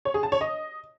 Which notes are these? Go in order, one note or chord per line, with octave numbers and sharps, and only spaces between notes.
C#5
G#4
A5
C#5
D#5